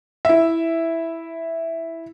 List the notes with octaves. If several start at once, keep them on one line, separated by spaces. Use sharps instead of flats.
E4 E5